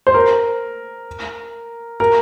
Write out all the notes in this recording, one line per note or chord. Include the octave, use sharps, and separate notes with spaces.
C5
A#4
A#4